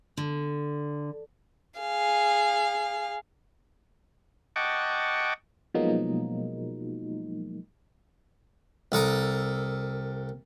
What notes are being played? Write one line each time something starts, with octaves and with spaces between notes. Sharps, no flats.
D3
G#4 F5
D#5 F#5 G5 A5 C#6 D6
B2 F3 F#3 G#3 A#3 D#4
C2 A4 A#4 D#6